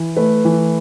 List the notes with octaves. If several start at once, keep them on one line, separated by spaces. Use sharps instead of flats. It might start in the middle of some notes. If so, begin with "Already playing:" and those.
Already playing: E3
A3 B4
E3